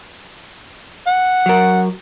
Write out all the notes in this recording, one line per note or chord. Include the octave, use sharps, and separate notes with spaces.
F#5
F#3 A#4